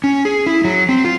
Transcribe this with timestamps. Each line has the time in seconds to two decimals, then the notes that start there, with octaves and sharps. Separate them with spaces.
0.04 C#4
0.25 G#4
0.47 E4
0.64 F#3
0.89 C4
1.05 F4